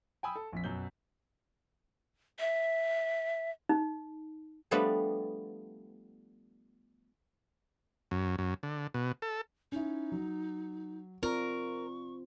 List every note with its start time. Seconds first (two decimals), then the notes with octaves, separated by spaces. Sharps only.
0.23 G5 G#5 B5 D#6 E6
0.36 A4
0.52 A#1 F2 B6
0.64 F#2 B2 F#3 G6 G7
2.39 E5
3.69 D#4
4.71 F3 G3 A3 B3 D4
8.11 F#2
8.39 F#2
8.63 D3
8.94 B2
9.22 A4
9.72 C#4 D#4 E4
10.12 F#3
11.23 C4 F4 A#4 D5 C#6